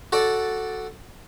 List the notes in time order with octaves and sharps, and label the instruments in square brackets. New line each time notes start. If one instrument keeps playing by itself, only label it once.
[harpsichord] F#4 A4 D5